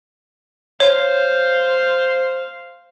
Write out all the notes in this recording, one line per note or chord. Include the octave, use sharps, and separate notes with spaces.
C5 C#5 F5